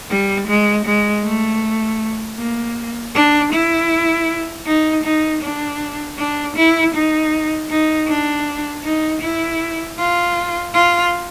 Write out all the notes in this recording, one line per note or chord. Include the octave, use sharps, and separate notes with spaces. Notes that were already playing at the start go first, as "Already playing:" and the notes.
G3
G#3
G#3
A3
A#3
D4
E4
D#4
D#4
D4
D4
E4
D#4
D#4
D4
D#4
E4
F4
F4